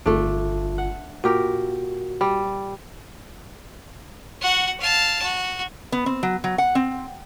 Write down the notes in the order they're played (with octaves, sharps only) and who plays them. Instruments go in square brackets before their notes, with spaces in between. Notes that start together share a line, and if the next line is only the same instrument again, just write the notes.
[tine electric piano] G1 F4 [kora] A3 D4
[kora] F#5
[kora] A#2 G4 A#4 [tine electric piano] F#4
[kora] G3
[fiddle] F#4 F#5
F5 A5
F#4
[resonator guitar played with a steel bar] B3
C4
F#3
F#3
F#5
C4